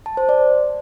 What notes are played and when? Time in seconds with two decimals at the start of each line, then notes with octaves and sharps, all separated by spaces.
0.06 A5
0.17 C5
0.29 D5